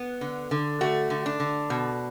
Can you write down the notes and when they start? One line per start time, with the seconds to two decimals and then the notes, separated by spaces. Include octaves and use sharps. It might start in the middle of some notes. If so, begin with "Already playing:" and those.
Already playing: B3
0.21 D3
0.51 D3
0.81 A3 F#4
1.10 D3
1.26 D4
1.40 D3
1.70 B2